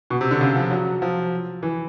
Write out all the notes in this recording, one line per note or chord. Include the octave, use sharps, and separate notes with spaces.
B2
C3
D3
C#3
F3
F#3
F3
E3